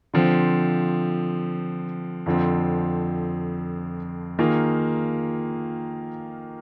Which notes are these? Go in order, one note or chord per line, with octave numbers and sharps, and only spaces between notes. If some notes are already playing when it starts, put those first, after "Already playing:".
D3 F3 C4
F2 D3 F3 C4
D#3 A#3 F4 G#4